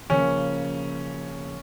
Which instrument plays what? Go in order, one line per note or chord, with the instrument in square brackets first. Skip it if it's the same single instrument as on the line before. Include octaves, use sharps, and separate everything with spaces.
[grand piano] C#3 F3 A#3 [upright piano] C#4